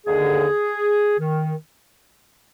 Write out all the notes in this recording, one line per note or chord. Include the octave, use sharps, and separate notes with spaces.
D#2 D3 G#4
D#3